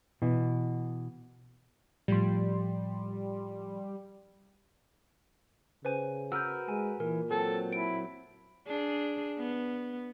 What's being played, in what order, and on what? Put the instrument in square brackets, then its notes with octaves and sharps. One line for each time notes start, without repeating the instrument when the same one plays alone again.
[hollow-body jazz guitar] B2 E3
[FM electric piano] A2 F3 C6 [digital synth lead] G3
[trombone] C#3 [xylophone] B4 C5 G#5
[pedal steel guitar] F#4 A#4 B4 [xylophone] E6 F6 G6
[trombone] G#3 [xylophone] G#5
[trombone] A#2 [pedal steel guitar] E3 [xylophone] A#4
[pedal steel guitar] F#3 C4 [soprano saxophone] A4
[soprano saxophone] E4 [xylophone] D7
[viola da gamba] D4 G#4
B3